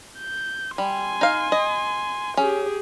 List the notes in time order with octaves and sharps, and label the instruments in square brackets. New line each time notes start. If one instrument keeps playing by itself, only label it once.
[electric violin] G6
[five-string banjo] G3 [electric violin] G#5 C6
[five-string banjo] D#4 F5
D#5
[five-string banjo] C#4 [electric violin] G4 G#4